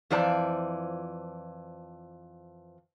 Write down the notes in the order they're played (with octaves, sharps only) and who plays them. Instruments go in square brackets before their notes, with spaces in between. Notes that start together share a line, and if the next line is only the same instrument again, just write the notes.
[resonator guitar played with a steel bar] F2 E3 F3 C5 D5 A5